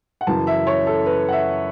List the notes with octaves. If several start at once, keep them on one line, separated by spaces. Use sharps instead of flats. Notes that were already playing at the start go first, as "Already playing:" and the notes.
F#5
F#2 C#3 E3 A5
E5
C#5
A4
B4
F#5
E5